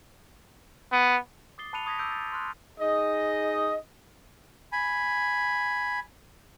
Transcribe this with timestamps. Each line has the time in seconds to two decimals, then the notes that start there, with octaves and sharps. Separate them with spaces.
0.92 B3
1.58 D6 D#6 A6 C7 G7
1.73 A5 B5 F#6 C#7 D#7 F7
1.86 C#6 D#6 G#6 A#6 B6
1.99 D6 E6 G6 A#6 D7
2.11 A6
2.32 C6 F6 F#6
2.80 D#4 G#4 D#5
4.72 G#5 B5